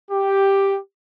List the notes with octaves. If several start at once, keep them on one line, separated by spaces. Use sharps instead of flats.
G4